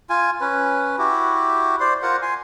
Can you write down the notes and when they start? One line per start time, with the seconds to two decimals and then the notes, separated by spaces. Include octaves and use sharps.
0.10 F4 G#5
0.41 C#4 B4
0.98 E4 F#4 G4
1.80 C5 D5 C6
2.02 F4 A#4 C5 F#5
2.22 G#5 C6